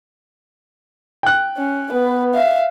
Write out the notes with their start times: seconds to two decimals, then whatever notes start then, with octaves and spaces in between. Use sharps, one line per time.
1.23 G5 F#6
1.58 C#4
1.92 B3 B4
2.34 E5 F5